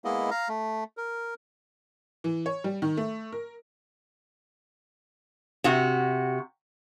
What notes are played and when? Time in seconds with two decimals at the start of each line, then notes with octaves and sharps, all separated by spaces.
0.05 G#3 A#3 B3 E4 D#5
0.31 F5 A#5
0.49 A3
0.97 A#4
2.24 E3
2.46 C#5
2.64 G3
2.82 D#3
2.97 A3
3.32 A#4
5.64 C3 F#4